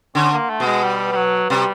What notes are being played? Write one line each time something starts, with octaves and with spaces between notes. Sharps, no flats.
D3 C#4
A#3
A3
B2
G#3
G3
G3
F#3
C3 G3